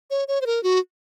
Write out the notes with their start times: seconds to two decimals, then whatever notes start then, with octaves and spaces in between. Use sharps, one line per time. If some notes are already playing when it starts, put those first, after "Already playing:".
0.10 C#5
0.28 C#5
0.41 C5
0.46 A#4
0.63 F#4